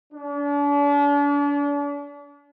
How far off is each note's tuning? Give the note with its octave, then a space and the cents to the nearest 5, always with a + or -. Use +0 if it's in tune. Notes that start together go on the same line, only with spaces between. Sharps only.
D4 -40